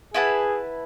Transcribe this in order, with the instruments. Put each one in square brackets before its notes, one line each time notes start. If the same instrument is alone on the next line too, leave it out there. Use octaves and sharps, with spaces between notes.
[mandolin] E4 B4 F#5 A5 [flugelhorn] G#4